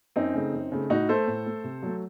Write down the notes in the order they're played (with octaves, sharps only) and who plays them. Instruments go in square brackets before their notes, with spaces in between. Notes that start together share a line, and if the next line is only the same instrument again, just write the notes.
[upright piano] F#2 C4 D#4
C#3 A3
F#2
C#3 A3
A2 D#4 F#4
A3 A4 C5
A2
A3
C3
F#3 A3